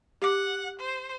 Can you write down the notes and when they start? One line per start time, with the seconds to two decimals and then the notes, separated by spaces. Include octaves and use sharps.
0.22 G4 F#5 D6
0.80 C5